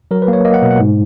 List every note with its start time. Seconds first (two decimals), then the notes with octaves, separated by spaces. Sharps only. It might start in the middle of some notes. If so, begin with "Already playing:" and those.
0.11 F#3 A#4
0.22 B4
0.28 A#3
0.33 C#5
0.45 A#3 D#5
0.54 F#5
0.62 B2
0.71 F#5
0.80 G#2